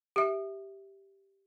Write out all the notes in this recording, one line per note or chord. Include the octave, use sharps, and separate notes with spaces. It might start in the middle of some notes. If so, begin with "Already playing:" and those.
G4 E5